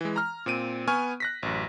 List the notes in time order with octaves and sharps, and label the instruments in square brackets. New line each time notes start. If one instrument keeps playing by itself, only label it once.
[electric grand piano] E3 G#3
A#5 F6
A#2 C4 D7 D#7
B3 G#5 C#6 F6
F#6 A#6 B6
A1 F#2